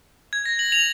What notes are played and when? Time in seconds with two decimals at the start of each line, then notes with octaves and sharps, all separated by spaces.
0.33 G#6
0.46 A#6
0.59 F#7
0.72 F7